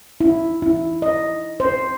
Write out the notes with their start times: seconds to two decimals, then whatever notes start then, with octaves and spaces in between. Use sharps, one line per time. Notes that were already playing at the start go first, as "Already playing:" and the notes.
0.21 E4
0.62 E4
1.02 D#5
1.60 C5